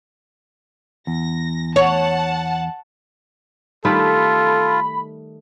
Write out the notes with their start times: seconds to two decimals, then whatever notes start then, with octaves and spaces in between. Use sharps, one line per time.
1.07 E2 A#6
1.76 C#5 F#5 A5
3.85 D#3 G3 A3 F4 A4 B5